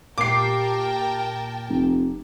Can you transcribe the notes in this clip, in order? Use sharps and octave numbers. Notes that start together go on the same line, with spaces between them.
A#2 G4 A#4 G5 A5 D6 C7
F1